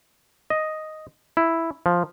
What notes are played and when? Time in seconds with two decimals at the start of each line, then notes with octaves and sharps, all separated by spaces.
0.50 D#5
1.37 E4
1.86 F3